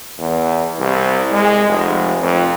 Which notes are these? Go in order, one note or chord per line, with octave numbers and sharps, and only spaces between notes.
E2
C2
G#3
F1
F2